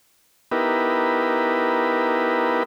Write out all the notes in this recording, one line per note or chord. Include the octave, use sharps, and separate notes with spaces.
B3 D#4 E4 G4 A#4 B4